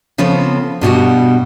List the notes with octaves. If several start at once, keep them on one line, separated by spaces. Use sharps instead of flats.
C#3 F3 B3 C4 A4 C#5
G2 B2 G3 F#4